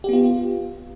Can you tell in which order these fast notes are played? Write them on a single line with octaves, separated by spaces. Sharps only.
G4 B3 F4